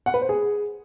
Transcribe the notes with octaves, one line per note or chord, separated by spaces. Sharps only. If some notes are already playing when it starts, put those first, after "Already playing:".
F#5
B4
C5
G#4